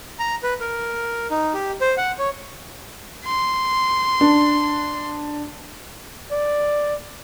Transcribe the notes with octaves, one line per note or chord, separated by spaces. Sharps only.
A#5
B4
A#4
D#4
G4
C5
F#5
C#5
C6
D4
D5